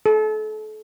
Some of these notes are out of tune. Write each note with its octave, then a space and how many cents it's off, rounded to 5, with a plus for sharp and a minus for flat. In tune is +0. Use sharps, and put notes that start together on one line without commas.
A4 -35